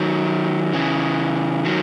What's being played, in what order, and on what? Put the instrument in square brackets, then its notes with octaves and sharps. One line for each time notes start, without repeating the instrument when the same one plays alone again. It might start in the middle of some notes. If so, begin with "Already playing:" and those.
Already playing: [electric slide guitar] D#3 F#3
C#3 E3
D#3 F#3